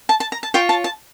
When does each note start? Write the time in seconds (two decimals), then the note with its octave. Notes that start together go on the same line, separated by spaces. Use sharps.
0.09 A5
0.20 A5
0.32 A#5
0.43 A5
0.54 F4 C#5 G5
0.69 A5
0.84 A5